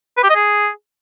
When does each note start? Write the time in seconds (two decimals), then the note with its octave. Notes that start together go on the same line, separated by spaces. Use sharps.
0.17 B4
0.23 G4
0.30 D#5
0.36 G#4